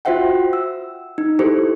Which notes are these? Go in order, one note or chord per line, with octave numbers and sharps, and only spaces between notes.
F4 F#4 C5 E5 F#5 G5
E6
D#4
E4 G4 A4 C5